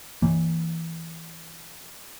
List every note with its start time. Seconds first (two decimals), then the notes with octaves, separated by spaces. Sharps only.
0.22 E3 A#3